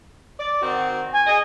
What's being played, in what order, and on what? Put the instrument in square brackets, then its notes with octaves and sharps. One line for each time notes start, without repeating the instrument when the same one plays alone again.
[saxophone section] D5
D#3 C4 F#4
[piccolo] G#5
[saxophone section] G#4 D#5